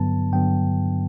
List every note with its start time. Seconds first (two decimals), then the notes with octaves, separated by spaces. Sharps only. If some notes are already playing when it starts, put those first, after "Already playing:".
Already playing: G2 D3 F#3 B3 A5
0.33 G2 D3 F#3 B3 G5